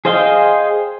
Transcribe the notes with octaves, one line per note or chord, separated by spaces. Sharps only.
G#4 C5 D#5 F5 G5